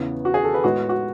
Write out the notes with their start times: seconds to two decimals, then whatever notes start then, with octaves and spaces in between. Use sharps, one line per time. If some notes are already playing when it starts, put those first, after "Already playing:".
Already playing: E2 C#3 E3 B3
0.25 F#4
0.34 G#4
0.44 A4
0.54 B4
0.64 A2 G#3 B3 F#4
0.89 F#4